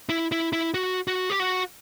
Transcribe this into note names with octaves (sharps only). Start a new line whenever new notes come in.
E4
E4
E4
F#4
F#4
G4
F#4